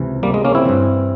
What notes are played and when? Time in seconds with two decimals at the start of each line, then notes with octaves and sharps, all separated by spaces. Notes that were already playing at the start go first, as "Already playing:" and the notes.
Already playing: C#2 C3 E3
0.23 G3 A#3
0.34 G#3
0.45 A#3 C#4
0.55 C4 E4
0.65 G2 E3